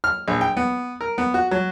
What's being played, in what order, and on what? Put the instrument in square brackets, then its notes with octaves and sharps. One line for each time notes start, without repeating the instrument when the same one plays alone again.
[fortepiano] F6
A#1
G5
B3
A#4
B3
F#4
F#3